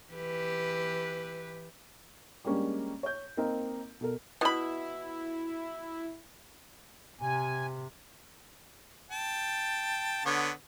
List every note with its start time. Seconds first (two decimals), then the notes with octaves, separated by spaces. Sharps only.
0.12 E3 G4 B4
2.45 G3 G#3 A#3 C#4 D4 G4
3.03 C#5 G6
3.37 A#3 C4 D#4 A#4
4.01 B2 A4 A#4
4.41 B2 E4 B5
7.21 C3 G#5
9.11 G5 A5
10.26 D3 B3 C#5